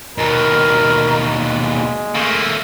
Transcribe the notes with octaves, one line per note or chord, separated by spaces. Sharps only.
D#2 B2 A#4
G#3
A3 A#3